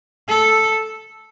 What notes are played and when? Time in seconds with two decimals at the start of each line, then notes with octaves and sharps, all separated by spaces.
0.28 A4